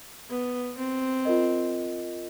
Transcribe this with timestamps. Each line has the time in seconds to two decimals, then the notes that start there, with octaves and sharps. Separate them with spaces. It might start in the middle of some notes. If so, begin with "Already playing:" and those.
0.30 B3
0.78 C4
1.25 F4 A#4 D#5